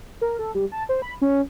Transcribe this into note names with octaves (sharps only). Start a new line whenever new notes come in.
A#4
A4
G3
A5
C5
B5
C#4